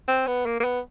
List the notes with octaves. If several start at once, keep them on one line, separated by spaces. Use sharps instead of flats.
C4
B3
A#3
A#3
B3